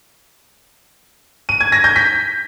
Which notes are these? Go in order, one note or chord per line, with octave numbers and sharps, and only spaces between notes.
D#7
G#6
A#6
G6
B6